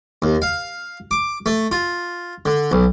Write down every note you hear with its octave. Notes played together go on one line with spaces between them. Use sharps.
D#2
F5
D6
A3
F4
D3
B1